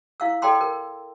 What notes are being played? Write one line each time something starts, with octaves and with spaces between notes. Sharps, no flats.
E4 F5 E6
A4 D5 G5 A#5 C6 E6
A#4